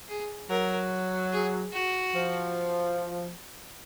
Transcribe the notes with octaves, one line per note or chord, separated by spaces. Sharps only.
G#4
F#3 A#4
G#4
F#4
F3